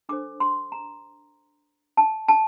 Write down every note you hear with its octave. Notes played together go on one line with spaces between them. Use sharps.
D4 A4 C5 D6
C6
A#5
A5
A5